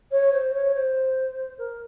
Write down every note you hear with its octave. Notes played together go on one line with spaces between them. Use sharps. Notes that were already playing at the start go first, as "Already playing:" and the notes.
C#5
C5
C#5
C5
A#4